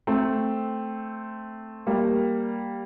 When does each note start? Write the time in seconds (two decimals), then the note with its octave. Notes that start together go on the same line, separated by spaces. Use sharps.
0.07 A3 C4
1.87 G3 A#3